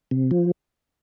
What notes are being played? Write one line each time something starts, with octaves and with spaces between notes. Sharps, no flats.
C3
F3